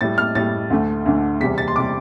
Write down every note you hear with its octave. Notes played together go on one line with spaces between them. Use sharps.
A2 G3 A6
F6
A2 G3 A6
D2 D3 A3
D2 D3 A3
E2 C3 G3 B6
A6
C6
C3 G3 D6